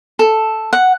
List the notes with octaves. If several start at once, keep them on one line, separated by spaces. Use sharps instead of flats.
A4
F#5